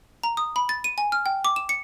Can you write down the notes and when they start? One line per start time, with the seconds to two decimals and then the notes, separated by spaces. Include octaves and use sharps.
0.23 A#5
0.37 D#6
0.56 B5
0.69 A6
0.84 D#7
0.98 G#5
1.12 F6
1.26 G5
1.45 D6
1.56 E7
1.69 C#7